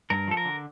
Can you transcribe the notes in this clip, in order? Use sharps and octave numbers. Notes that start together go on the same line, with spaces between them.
G2 A#4
F3 A4
A#4
D3